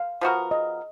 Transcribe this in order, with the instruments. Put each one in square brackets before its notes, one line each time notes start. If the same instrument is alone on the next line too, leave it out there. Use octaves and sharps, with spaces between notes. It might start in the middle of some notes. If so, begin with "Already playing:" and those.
Already playing: [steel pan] F5
[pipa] F3 B3 F#4 A#4
[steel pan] D#5